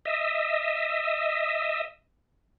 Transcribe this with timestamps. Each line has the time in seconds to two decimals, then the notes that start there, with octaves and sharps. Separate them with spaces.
0.05 D#5 E5